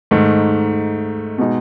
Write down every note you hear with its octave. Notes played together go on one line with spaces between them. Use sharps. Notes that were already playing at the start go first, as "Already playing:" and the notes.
G#2 D#3 A3 D#4
B2 G#3 D#4